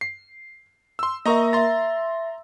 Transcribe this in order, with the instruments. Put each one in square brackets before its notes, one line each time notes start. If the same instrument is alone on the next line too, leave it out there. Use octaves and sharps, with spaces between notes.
[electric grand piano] C7
C6 E6
[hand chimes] A#3 A#4 E5 [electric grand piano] D#5 A#5 C#6
[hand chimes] E5 A6 [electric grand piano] A#5 C6